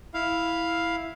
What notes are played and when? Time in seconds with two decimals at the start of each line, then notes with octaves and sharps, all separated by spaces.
0.14 E4 F5